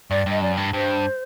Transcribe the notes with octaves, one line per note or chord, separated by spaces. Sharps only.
G2 D5
G2 D#5
F#2 D5
G2
G2 C5